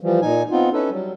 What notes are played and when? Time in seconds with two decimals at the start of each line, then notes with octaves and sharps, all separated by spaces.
0.01 E3 F3 G3
0.22 A#2 D#4 G#5
0.51 B3 C4 D#4 F4
0.73 C#4 D#4 E4 A4 B4
0.91 F#3 G3